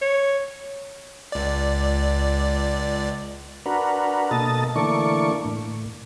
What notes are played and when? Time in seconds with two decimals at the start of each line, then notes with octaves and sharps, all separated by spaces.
0.02 C#5
1.32 C#2 D5
3.66 D4 F#4 A#4 B4
4.31 B2 A#3 A4 D#5 A6
4.76 D3 E3 A3 A#3 D5 C#6
5.45 A2